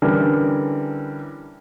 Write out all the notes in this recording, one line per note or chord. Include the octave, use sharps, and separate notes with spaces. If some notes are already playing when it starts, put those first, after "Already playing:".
D3 E3 G3 C#4 A#4